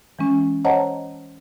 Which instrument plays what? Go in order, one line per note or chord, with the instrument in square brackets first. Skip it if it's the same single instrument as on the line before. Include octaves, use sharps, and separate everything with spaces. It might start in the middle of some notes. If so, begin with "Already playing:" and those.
[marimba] E3 G#3 C#4
C5 C#5 D#5 F#5 A5 A#5